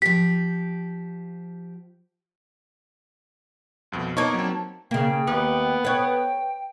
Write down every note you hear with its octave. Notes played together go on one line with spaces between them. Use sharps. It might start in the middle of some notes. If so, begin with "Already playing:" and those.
F3 G4 B6
C2 F2 B2
A#3 B3 D4 D#4 C#5 C#6
F#3 C4
C#3 A#3 G5
D#2 B3
B4 C#5 G5